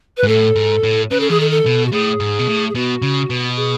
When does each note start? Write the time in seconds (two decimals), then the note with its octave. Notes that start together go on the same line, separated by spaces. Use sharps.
0.17 B4
0.23 G#2
0.28 A2 A4
0.56 G#2
0.84 A2
1.10 C#3 B4
1.20 A4
1.29 E3 G#4
1.38 D#3 A4
1.51 A4
1.66 B2
1.86 F#4
1.92 A2 G#4
2.20 G#2
2.39 B2
2.47 A2
2.69 G#4
2.75 B2 F#4
3.02 C#3
3.30 B2
3.56 G#4